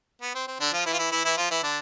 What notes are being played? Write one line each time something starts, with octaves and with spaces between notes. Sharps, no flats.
B3
C4
C4
D3 D4
F3 F4
E3 E4
F4
E3 E4
E3 E4
E3 E4
F3 F4
E3 E4
D3 D4